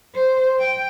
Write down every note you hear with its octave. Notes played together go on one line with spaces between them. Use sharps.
C5
G5